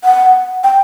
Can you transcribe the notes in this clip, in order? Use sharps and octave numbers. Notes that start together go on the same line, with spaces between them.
F#5
G5